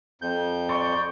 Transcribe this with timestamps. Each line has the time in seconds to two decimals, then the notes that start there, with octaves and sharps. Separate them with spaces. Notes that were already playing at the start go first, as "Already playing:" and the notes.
0.22 F2 G6
0.69 D5 C6 C#6